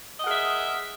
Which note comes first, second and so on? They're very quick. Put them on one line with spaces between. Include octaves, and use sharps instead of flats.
D#5 F#5 G#4 A#4 E5